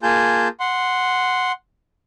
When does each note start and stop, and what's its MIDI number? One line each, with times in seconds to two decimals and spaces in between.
0.03 0.48 58
0.03 0.48 65
0.03 0.48 68
0.03 0.48 80
0.03 0.48 81
0.03 0.48 91
0.60 1.52 78
0.60 1.52 84